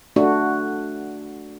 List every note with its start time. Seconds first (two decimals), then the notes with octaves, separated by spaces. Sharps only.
0.16 A3 D4 F#4